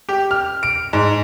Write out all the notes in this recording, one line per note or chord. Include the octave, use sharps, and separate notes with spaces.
G4
F6
D7
G#2